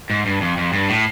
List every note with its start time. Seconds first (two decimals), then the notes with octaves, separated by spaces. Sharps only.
0.10 G#2
0.26 G2
0.41 F2
0.57 F2
0.73 G2
0.89 A2